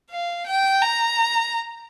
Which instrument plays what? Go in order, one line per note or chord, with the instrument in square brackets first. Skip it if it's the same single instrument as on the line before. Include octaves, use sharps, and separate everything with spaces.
[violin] F5
G5
A#5